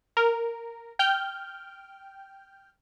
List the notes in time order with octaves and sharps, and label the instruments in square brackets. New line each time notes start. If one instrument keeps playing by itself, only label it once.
[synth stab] A#4
G5 F6 G6